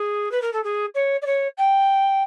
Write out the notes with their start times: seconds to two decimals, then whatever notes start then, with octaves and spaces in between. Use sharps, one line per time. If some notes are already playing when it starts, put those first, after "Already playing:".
Already playing: G#4
0.31 B4
0.41 A#4
0.53 A4
0.63 G#4
0.94 C#5
1.21 D5
1.26 C#5
1.57 G5